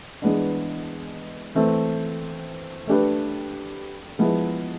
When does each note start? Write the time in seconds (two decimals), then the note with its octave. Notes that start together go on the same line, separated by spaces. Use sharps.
0.22 E3 G#3 B3 D4
1.55 E3 A3 C4
2.87 A3 D4 G4 B4
4.19 F3 G#3 B3 E4